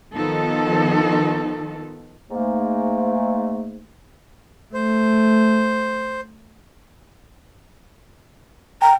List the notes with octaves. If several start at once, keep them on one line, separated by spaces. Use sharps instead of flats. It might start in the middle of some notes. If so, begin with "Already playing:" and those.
D#3 F3 B3 D#4 A4
G#2 A3 A#3
A3 C5
G5 A#5